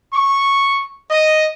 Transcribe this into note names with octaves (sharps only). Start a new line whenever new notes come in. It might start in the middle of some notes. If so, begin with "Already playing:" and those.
C#6
D#5